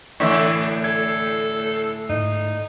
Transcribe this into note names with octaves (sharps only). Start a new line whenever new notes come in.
A2 D3 E3 E4 C#6 E6
A4 G#6
G#2 D#4